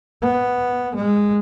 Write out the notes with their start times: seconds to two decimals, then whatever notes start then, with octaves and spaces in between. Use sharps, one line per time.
0.22 B3
0.95 G#3